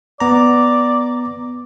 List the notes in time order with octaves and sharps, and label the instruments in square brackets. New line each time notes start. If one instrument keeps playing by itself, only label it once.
[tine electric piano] B3 A#5 [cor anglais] D5